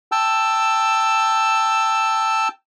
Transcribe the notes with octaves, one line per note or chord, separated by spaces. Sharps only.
G5 A5 E6